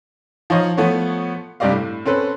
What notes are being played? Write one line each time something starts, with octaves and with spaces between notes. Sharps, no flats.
F3 D#4 C#5 D#5 F5
F3 A3 B3 C#5
G2 C3 G4 D5 D#5 F5
A2
C4 C#4 A4 B4